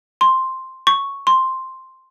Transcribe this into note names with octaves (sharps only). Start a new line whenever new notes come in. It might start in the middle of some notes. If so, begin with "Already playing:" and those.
C6
C#6
C6